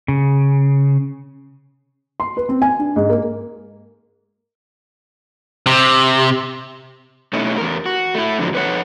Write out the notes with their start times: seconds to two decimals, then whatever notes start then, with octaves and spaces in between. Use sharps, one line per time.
0.08 C#3
2.20 C6
2.37 B4
2.49 C4
2.62 G#5
2.79 D4
2.96 G#2
3.09 A#3
5.66 C3
7.33 B2 A3 C#4 D#4 E4
7.58 E2 A#4
7.86 F#4
8.15 A3 E4
8.39 F2 G#2 D3 F3 F#3
8.53 F2 B4 C#5 F#5